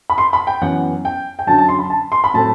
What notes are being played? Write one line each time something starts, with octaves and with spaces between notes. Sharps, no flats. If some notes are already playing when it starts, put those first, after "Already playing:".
B5
C6
B5
G5
F#2 E3 B3 F#5
G5
G5
F#2 D3 F#3 A5
A5
C6
B5
A5
C6
B5
A2 F#3 A3 C4 A5